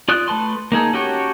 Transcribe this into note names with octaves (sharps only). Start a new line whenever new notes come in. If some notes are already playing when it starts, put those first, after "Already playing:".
F4 D5 D#6 F#6
A3 B4 A5 C6
A#3 D#4 G#4 A4
C#4 F#4 G4 A4 C#5